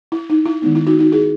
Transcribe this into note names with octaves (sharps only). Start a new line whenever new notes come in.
E4
D#4
E4
D#3 G#3 B3 D#4
E4
D#4 F#4
D#4 F#4
E4 G#4